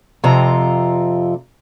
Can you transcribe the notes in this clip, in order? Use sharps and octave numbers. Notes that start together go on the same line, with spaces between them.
F2 C3 F4 A#5